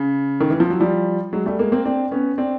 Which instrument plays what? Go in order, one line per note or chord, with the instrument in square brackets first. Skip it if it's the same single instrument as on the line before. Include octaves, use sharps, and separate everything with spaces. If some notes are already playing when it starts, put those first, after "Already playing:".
Already playing: [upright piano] C#3
D#3
E3
F3
F#3
F3 G3
F#3 G#3
G3 A3
G#3 A#3
A#3 C4
C4 D4
B3 C#4
C4 D4